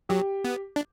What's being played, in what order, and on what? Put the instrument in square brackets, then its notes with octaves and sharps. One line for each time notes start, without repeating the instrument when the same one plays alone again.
[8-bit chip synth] F#3 [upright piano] G4
[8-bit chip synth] B3
D4